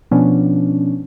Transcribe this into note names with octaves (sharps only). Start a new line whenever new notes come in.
B2 F3 B3 C#4 D4